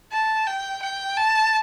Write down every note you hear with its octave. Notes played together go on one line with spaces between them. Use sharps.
A5
G5
G5
A5